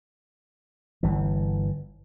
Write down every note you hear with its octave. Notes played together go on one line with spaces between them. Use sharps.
G1 E3